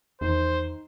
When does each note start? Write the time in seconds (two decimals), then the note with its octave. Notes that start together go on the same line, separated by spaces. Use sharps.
0.21 E2 D#3 C5